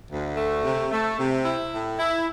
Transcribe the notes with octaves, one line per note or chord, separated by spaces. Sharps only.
D2
A3
C3
A3
C3
E4
A2
E4